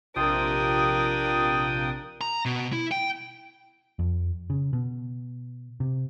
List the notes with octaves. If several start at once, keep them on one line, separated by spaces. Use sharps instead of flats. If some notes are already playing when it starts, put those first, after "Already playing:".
A#1 C3 D4 F4 A#4 G5 D#6
A#5
B2
E4
G5
F2
C#3
B2
C3